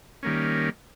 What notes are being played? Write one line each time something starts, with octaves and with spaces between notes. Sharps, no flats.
D#3 G3 A#3 C#4